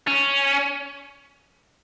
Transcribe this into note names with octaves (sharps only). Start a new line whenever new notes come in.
C#4